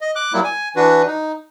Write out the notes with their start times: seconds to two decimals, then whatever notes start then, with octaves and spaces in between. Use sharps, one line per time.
0.01 D#5
0.16 D6 F#6
0.33 F#3 G3 A#3 E4
0.44 G#5
0.76 E3 D4 F#4 B4
1.07 D#4